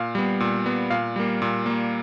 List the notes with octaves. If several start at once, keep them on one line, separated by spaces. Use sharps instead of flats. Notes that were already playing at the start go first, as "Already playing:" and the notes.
Already playing: A#2 F5
G3 B3
A#2
G3 B3
A#2 F5
G3 A#3
A#2
G3 A#3